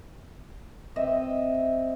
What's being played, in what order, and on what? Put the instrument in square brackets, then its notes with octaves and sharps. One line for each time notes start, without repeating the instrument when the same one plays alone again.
[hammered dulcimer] C4 D#5 E5